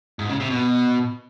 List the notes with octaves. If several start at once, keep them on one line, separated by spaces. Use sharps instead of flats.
G#2
C#3
C3
B2